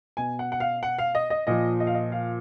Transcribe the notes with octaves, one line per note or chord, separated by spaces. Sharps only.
B2 G#5
F#5
F#5
F5
F#5
F5
D#5
D#5
A#2 F3 D#5
D#5
F5
D#5
F5